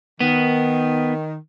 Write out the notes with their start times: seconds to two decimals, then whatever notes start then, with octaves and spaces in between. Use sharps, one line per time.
0.20 D#3 B3